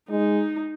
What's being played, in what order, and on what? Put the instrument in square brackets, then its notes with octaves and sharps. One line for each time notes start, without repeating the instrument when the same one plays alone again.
[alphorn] G#3 [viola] D#4